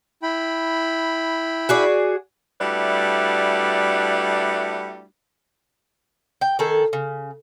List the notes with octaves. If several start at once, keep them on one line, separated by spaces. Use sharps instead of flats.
E4 G5 B5
F#4 G#4 D5
G3 A3 D4 E4 F#4 B4
G5
D#3 G#4 A4
C#3